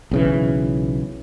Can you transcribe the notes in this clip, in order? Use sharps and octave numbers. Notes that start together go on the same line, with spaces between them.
B1 C#3 E3